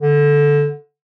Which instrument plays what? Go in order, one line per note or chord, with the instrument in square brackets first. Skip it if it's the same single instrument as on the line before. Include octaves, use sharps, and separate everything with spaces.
[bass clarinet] D3